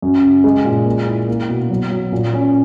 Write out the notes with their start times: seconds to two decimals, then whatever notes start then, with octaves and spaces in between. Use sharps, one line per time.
0.02 F#2
0.24 C#3
0.44 G#3
0.65 A#2
0.86 A#3
1.07 E4
1.28 A#3
1.49 B2
1.70 F#3
1.91 F#3
2.12 A#2
2.33 C#4